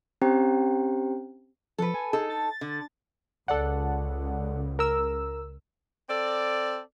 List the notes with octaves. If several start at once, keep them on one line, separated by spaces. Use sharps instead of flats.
C4 C#4 G4 C5 G5 A#5
F3 A4 B4
G#5
D#4 G#4 A4
A6
D3
C#2 A4 D5 F#5
A#4 E6
C4 A4 D5